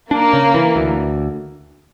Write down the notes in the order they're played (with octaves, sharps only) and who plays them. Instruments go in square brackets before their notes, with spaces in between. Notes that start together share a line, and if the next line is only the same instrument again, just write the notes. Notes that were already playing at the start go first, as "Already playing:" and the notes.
[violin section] A#3 [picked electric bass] D4
[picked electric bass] C#3
E3
D2